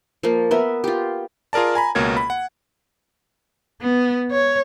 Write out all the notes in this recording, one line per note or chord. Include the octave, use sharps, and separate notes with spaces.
F3 A#3
B3 A#4 E5
F4 G4
F4 G#4 A#4 D5 A5
G#5 A#5 B5
C#2 B2 A#3 A#4 C#5 G#6
B5
F#5
B3
C#5